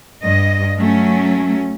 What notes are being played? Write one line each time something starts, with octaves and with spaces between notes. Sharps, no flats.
G2 D#5
F#3 A3 C#4